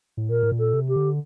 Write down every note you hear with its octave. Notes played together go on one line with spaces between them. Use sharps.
A2
A#2 A#4
A2
A#2
A4
C3
G4
D3